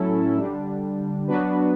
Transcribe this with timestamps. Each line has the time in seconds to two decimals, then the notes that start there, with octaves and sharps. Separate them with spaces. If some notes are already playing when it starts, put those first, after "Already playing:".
Already playing: A2 F#3 C#4 E4 A4
0.38 D3 G3 D4
1.28 F#3 B3 D4 F#4 B4